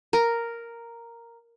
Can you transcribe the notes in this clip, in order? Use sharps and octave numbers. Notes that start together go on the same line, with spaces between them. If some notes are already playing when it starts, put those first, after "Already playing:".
A#4